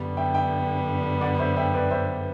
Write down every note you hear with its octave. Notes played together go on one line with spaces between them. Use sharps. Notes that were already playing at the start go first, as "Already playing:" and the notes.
Already playing: F#2 D3 G3 B3
E5 G5
E5 G5
D5 F#5
C5 E5
E5 G5
B4 D5
C5 E5